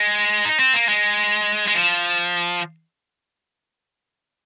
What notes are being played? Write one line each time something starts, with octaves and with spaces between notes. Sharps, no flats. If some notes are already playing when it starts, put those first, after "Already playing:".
Already playing: G#3
D#4
C4
A#3
G#3
G#3
F3